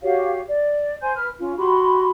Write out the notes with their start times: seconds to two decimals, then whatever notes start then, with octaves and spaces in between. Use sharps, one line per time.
0.02 F#4 G4 C#5 F5
0.48 D5
1.02 C5 G#5 C6 G6
1.16 B4 F6
1.38 C#4 F4
1.58 F#4 G4 B5 C6